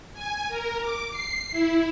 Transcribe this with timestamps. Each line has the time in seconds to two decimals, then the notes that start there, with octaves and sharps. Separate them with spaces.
0.13 G#5
0.48 A#4
0.80 D6
1.10 C7
1.51 E4